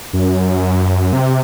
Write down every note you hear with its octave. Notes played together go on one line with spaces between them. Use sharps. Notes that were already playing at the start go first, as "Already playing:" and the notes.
F#2
C3